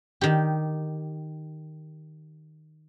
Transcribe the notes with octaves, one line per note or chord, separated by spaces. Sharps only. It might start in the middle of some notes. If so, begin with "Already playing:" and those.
D#3 G4